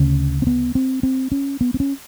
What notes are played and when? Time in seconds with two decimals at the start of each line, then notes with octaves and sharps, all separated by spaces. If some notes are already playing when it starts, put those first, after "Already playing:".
Already playing: D2 C#3 C#4
0.42 C4
0.47 B3
0.75 C4
1.03 C4
1.32 C#4
1.61 B3
1.74 C4
1.80 C#4